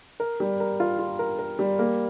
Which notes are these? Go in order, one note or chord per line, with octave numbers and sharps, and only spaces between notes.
A#4
G3
A#4
F4
F4
A#4
A#4
G3
A#3